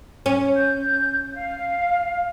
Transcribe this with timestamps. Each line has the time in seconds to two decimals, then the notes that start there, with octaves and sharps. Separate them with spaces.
0.26 C#4
0.55 G6
1.35 F5